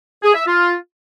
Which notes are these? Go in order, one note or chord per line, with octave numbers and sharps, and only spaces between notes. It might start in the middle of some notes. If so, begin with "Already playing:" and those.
G#4
E5
F4